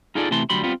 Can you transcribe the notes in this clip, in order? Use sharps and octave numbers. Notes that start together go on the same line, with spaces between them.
D#4 F4 G#4 A4 D5
C3 E3 A3 A5 C6
D2 F#3 G3 B5 C6
G3 B3 C4 F4